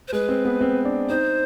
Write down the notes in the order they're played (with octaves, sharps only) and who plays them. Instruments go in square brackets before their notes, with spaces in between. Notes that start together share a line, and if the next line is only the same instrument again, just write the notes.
[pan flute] C5
[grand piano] G#3 [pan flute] B4
[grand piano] C4
B3
C4
D4
[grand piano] D#4 [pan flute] C5